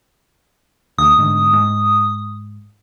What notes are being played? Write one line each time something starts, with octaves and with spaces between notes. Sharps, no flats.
D2 D#6
G#2 D3
G#2